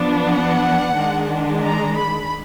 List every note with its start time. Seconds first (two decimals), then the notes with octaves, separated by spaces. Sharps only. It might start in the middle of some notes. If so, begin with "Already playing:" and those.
Already playing: F3 B3 D4
0.25 F#5
0.95 D#3 G#3 D4
1.64 A#5
1.98 B5